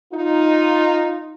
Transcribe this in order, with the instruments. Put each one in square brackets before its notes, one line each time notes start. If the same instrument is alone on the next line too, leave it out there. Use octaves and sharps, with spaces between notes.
[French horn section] D#4 F4